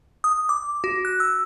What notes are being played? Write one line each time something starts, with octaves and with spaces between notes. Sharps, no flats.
D#6
D6
F#4
F#6
E6